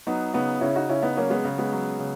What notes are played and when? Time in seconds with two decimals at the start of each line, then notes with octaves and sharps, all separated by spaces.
0.07 F#3 B3 D#4
0.34 C#3 B3 D#4
0.61 C#3 C#4 E4
0.76 D#4 F#4
0.89 C#3 C#4 E4
1.03 B3 D#4
1.17 F#3 A#3 C#4
1.30 G#3 B3
1.45 C#3
1.58 G#3 B3
1.72 F#3
1.99 C#3